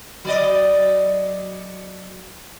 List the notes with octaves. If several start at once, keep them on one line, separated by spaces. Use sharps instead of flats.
F#3 D5 D#5